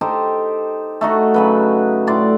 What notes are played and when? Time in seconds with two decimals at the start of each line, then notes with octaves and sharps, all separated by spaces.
0.01 D#4 G4 A4 C5
1.01 A3 D#4 F#4
1.34 C#3 F#3 B4
2.07 A2 D5 C6